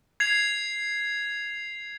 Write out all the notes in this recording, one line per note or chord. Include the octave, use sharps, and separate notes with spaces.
G#6 C7 F7